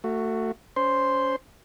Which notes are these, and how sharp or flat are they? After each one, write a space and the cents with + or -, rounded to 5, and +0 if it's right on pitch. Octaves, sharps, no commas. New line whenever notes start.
A3 +25 F#4 +0
C#4 +25 C5 +0 C6 +0